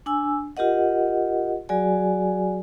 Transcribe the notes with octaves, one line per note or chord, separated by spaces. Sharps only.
D4 G#5 E6
F4 G4 A#4 D#5 F#5
F#3 F#4 G#4 D5 G#5